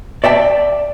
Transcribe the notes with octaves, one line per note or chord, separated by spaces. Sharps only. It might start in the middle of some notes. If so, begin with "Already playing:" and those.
D5 E5 G5 A5